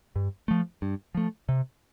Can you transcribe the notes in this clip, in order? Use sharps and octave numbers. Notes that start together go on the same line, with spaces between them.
G2
F3 A3
G2
F3 A3
C3